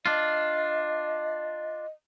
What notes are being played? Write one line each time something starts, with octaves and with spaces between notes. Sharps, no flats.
D4 F4 D#5